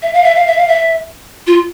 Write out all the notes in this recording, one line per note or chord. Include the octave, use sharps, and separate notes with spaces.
E5
F5
E5
F5
E5
F5
E5
F4